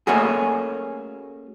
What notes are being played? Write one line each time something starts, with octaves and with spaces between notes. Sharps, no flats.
A3 A#3 C#4 F#4 G#4